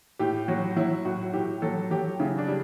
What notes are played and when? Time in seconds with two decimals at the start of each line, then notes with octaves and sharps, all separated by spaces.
0.19 A2 G4
0.48 F#3 F#4
0.76 F#3 E4
1.05 A2 F#4
1.33 A2 G4
1.62 F#3 A4
1.91 F#3 G4
2.19 C#3 E4
2.38 D4
2.48 G3